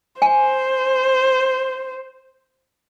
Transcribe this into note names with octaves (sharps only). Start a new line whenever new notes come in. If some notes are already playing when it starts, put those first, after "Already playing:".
C5 G#5